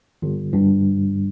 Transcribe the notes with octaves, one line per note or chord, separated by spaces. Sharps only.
G1
G2